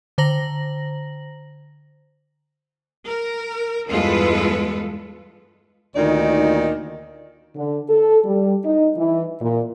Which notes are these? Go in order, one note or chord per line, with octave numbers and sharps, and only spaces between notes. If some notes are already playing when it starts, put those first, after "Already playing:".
D3 C5 A#5 A#6 F#7
A#4
E2 G2 G#3 F4 A4 B4
D2 A#2 D#3 D#4 D5
D3
A4
G3
D#4
E3
A#2